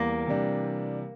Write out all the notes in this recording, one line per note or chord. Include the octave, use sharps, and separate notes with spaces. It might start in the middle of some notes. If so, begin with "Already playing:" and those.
Already playing: E2 G3 A#3
C3 E3 G3 D4